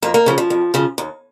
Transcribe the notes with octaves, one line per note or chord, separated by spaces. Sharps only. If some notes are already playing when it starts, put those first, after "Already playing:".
F2 A#3
A#3
C#3 F3
F3
F2
C#3 F3
D#2